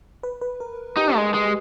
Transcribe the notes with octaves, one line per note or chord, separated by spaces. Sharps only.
B4
B4
A#4
D#4 G4
G#3
G#3